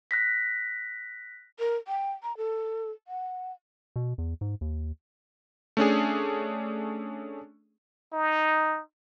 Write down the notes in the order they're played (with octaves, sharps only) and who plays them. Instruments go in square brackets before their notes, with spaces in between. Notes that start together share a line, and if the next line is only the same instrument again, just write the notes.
[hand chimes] F#6 A#6 B6
[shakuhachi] A#4
G5
A#5
A4
F#5
[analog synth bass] B2
E2
G#2
D#2
[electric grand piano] A3 C#4 D4 G#4
[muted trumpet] D#4